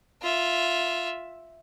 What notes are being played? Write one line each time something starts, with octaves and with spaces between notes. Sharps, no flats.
F4 E5